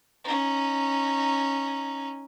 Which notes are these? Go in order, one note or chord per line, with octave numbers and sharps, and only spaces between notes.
C#4 D#4